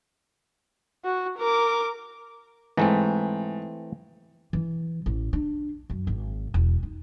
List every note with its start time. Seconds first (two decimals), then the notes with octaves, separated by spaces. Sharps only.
1.05 F#4
1.38 A#4 D6
2.77 G#2 E3 A3 C4
4.53 E3
5.06 A1
5.33 D4
5.90 F#2
6.07 G#1
6.54 E1
6.83 D#4